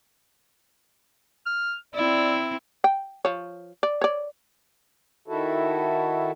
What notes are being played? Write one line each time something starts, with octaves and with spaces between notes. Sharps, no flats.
F6
C4 E4 D5
G5
F3 C#5
D5
C#5 D5
D#3 E4 F#4 A4